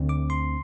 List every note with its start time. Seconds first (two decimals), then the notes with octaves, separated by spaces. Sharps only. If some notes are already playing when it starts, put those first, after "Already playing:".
Already playing: D2 D3 A3 C4
0.09 D6
0.30 C6